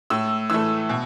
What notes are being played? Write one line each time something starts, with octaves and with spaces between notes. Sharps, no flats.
A2 E6
E3 A3 E6
B2